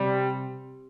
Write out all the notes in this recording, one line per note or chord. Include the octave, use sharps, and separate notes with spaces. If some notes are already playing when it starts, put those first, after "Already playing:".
Already playing: C3 G3